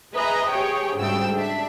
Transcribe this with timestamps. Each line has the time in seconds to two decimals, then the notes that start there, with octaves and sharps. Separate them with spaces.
0.13 G#4 B4 D#5 E5 A#5
0.49 G4 G#4 C#5 G5
0.97 D2 G#2 C#3 G3 G5 E6
1.37 D4 E5